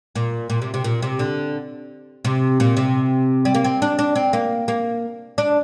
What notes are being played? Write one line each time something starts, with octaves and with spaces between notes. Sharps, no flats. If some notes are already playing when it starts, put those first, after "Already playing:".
A#2
A#2
C3
C3
A#2
C3
D3
C3
A#2
C3
G3
A#3
C4
D4
D4
C4
A#3
A#3
D4